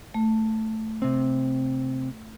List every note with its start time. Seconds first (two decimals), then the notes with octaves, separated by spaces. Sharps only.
0.14 A3
1.02 C3 C4